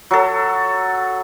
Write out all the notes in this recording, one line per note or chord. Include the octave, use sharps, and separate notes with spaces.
F#3 A4